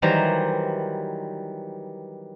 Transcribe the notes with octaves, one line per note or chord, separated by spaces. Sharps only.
D#3 E3 F#3 G3 C5 A#5